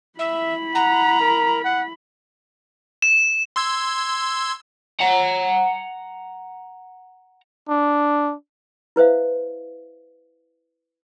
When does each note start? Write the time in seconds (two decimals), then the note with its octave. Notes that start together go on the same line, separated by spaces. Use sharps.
0.19 E4 E5 B5
0.75 F#5 A#5
1.20 A#4
1.64 F#5
3.02 E7
3.56 C6 E6 G#6
5.00 F#5 A#5
7.69 D4
8.96 E4 B4 C5 E5 F5